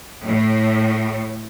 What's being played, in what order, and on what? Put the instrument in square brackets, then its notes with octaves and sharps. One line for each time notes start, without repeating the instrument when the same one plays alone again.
[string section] A2